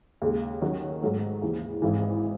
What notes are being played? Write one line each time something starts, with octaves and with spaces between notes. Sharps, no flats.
D#2 C#3 G#3
D#3 F#3 C#4
G#2 F#3 A3
D#2 C#3 E3
G#1 G#2 E3